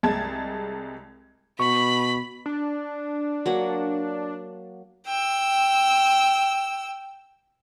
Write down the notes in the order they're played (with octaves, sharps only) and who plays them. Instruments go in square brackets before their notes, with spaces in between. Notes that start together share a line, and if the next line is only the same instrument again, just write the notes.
[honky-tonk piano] C2 G#3 A5 G#6
[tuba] B2 [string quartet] B5 [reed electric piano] C#6
[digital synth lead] D4
[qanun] F#3 A#3 F#5
[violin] G5 E6